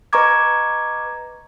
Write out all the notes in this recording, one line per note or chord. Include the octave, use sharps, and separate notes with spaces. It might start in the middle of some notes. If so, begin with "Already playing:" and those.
B4 D#5 A#5 C#6 D6 G#6